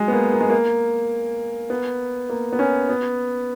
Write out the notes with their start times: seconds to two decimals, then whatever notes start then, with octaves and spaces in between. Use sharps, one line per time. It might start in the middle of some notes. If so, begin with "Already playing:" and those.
Already playing: F#3 G#3
0.08 B3
0.13 A#3
0.33 A#3
0.41 G#3
0.50 A#3
1.70 B3
2.30 A#3
2.53 B3
2.59 C#4
2.89 B3